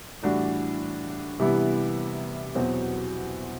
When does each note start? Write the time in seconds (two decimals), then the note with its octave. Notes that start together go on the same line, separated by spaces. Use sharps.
0.23 A2 E3 G3 D4 F#4
1.39 C3 E3 G3 B3 E4
2.55 E2 B2 F#3 C4